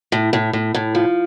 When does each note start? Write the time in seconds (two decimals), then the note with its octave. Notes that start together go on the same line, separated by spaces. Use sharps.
0.12 A2
0.33 A2
0.53 A2
0.75 A2
0.95 F3